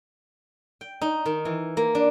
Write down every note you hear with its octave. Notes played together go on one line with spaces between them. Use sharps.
G5
D#4
D#3
E3
A#3
D4